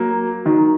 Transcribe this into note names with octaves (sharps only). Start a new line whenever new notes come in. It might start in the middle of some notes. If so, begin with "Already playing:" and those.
Already playing: F#3 A#3
D#3 F#3